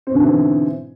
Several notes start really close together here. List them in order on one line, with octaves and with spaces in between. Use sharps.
C4 B2 D3 G#2 E3